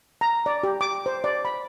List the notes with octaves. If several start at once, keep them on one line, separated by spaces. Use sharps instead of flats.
A#5
D5
G4
D6
C5
D5
B5